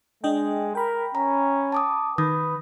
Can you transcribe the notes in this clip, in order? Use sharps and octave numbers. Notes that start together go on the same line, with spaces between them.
G#3 D4 D#5 G5
A#4 G5 B5
C#4 A#5
A5 D6 D#6
D#3 B4 D#6